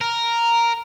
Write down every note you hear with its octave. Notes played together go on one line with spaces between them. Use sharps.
A#4